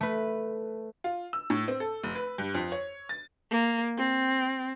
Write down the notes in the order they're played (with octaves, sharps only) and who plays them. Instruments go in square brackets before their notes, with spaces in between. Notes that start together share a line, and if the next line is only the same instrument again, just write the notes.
[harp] A3 B4
[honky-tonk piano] F4
E6
A2
C4
A4
F1
B4
G2
F2
C#5
A6
[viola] A#3
C4